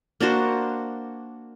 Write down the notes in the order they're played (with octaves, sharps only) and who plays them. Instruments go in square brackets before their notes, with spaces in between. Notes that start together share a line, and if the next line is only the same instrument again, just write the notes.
[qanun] A#3 D4 F#4 C5